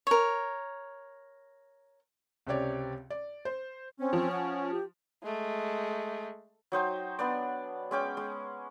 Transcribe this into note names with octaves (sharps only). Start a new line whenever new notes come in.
A#4 C#5
C#2 C3 C4 G4 C#5 D5
D5
C5
C4 C#4
F3
F#5
G4
G#3 A3
F#3 D#4 C5 G5
B3 D4 D5
G#3 C#4 G5 D6
G#3